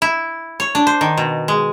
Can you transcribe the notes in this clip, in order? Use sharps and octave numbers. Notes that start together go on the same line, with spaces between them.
E4
C#5
D4
C5
D#3
B2
G#3